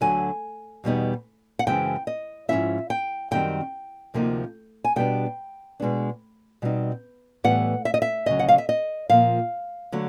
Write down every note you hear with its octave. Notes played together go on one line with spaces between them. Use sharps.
D2 D3 F#3 G#5
E2 B2 G3 B3 D#4
F#5
F#2 C#3 E3 G#3 C4 G5
D#5
G#2 F3 A#3 C#4 E4 E5
G5
F#2 D#3 G3 C4 G5
D2 C3 F3 A#3 D#4
G#5
B2 G3 B3 D4 G5
B2 G#3 B3 D4
B2 G3 C4 D#4
A2 E3 G3 B3 F#5
E5
D#5
E5
D2 C#3 F#3 D#5
F#5
F5
E5
D#5
A#2 F3 A#3 F5
D3 F#3 A3 D4